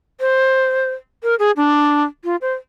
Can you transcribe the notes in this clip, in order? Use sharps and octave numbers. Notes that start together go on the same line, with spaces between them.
C5
A#4
G#4
D4
F4
C5